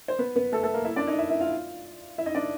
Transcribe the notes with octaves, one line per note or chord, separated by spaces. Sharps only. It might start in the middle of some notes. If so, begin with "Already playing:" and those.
C5
B3 B4
B3 B4
A3 A4
A3 A4
A#3 A#4
E4 E5
D4 D5
D#4 D#5
E4 E5
E4 E5
F4 F5
E4 E5
D#4 D#5
D4 D5